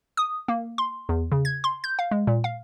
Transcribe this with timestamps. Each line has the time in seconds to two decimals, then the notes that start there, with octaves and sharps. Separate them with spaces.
0.17 D#6
0.48 A#3
0.78 C6
1.09 E2
1.32 C#3
1.45 G#6
1.64 C6
1.84 G6
1.99 F5
2.11 G#3
2.27 A#2
2.44 F5